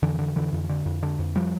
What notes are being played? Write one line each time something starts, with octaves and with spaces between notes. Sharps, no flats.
F2 D3 E3
D3
F2 D3 E3
F2
D3
F2
D3
F2
F3 G3